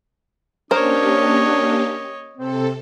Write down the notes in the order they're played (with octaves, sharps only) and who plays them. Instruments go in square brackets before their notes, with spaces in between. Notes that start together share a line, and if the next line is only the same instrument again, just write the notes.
[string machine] A#3 C#4 G4 [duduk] D4 [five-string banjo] A#4 C5 [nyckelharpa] C#5 D#5
[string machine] C3 A4 [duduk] C4